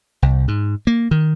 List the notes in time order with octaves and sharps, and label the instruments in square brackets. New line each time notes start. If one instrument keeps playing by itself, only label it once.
[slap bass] C2
G#2
A#3
D#3